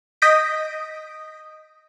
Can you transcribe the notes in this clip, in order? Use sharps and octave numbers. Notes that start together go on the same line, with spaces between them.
D#5 D#6 G6 A#6 B6 D7